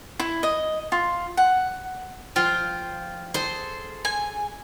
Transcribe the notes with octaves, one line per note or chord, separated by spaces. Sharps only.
E4
D#5
F4
F#5
F3 F4 C5 G5
G#4 A4 C5
G#5